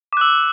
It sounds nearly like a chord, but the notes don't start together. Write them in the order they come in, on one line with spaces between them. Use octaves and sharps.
D6 F#6 E6